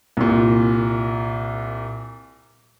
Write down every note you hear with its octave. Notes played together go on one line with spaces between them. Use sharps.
C2 A#2